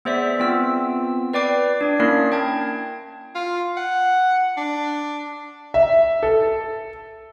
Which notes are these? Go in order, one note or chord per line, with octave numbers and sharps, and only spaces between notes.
B3 G#4 C5 D5 E5 B6
B3 C4 F4 E6
B4 D5 G5 D6 C7
D4 D5
A#3 C#4 D4 E4 A#4 C7
G5 A5 G#6
F4
F#5
D4
E5
A4